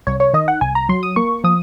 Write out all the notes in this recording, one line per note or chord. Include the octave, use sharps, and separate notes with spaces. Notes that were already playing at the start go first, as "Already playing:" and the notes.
C2 C#5
C#5
D#3 D#5
F#5
C2 G#5
A#5
F#3 C6
D#6
A#3 C#6
F3 D#6